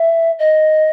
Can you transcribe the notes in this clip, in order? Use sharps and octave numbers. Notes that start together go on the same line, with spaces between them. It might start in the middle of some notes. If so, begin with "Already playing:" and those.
Already playing: E5
D#5